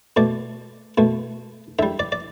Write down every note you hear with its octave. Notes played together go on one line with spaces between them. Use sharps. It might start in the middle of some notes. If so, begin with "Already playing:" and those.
B2 A3 D5
B2 A3
D3 G3 E5
D5
D5